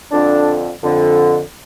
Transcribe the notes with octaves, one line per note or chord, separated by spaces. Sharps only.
F2 D3 D4
F2 D3